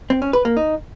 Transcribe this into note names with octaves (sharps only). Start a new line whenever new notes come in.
C4
C#4
B4
A#3
D#4